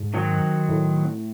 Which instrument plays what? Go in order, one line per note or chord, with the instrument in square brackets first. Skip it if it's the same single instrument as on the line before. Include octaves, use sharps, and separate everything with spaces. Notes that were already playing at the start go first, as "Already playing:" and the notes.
Already playing: [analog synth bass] G#2
[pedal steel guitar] D#3 F#3 C4 F#4 C#5
[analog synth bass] A2